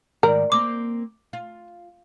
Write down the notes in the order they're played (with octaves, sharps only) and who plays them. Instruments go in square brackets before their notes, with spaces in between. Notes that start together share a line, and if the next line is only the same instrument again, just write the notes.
[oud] G#2 D#3 D5 [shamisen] A#4
[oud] A#3 C4 [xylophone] D6
[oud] F4